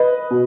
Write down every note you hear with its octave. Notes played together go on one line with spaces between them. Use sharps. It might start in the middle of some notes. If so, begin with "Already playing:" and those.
Already playing: B4 D#5
B2